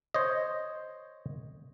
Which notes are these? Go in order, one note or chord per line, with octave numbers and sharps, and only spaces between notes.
C5 C#5 D#5